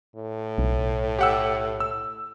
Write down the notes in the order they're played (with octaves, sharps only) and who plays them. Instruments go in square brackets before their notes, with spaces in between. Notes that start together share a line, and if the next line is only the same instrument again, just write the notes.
[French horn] A2
[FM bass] B1
[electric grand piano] G4 F#5 E6
E6